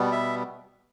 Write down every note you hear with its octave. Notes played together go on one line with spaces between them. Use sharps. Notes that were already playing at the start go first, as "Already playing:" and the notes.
Already playing: B2 G3 B3
E5